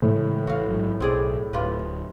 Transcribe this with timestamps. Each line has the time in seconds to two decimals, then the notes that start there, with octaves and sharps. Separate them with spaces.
0.02 A2 C#3 E3 G#3
0.47 A1 E3 F#4 F5
0.69 A1 G#2 F#3
1.00 B1 C4 G#4 D5
1.53 D1 F4 G4 B4